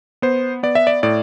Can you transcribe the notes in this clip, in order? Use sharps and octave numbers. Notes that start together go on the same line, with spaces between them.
B3 C5
B3 D5
E5
D5
A2 D5